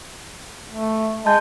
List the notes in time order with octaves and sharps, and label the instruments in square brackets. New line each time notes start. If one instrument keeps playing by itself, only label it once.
[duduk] A3
[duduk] G#3 [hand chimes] A5 G6